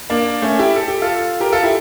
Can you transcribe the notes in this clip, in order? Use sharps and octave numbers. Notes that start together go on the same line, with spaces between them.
A#3 D4
A3 C#4
E4 G4
A4
G4
F4 A4
G4 A#4
F4 A4
E4 G4